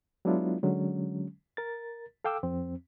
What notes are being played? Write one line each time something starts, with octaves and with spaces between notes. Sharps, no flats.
F#3 G#3 B3 D4 E4 F4
D3 F#3 G#3 C#4
A#4 A6
A4 F5 G5 D6 E6
F2 C4